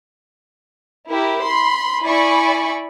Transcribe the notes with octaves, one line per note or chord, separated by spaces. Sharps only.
E4 G4 A#4
B5 C6
E4 D5 G#5 B5 C#6